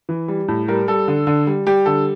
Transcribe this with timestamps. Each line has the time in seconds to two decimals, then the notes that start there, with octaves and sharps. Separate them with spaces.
0.09 E3
0.28 G3
0.48 A2
0.68 G3 A#4
0.88 G3 A4
1.08 D3
1.27 D3
1.47 G3
1.67 G3 G4
1.86 D3 A4